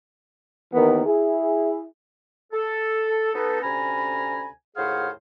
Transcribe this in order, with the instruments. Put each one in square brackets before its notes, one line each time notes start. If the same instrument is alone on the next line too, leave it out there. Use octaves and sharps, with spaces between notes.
[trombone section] D#2 D#3 E3 B3 A#4
E4 G#4
[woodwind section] A4
B3 D#4 A4
D2 C3 C#4 G#5 A#5 B5
D#2 A2 G#4 C5 F5 F#5